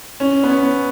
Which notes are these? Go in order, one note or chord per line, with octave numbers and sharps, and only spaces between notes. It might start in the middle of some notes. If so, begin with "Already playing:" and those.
C#4
B3
C#4